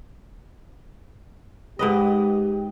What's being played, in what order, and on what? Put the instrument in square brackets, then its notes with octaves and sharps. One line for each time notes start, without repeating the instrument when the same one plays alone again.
[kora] G#2 B4 D#5 [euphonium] G4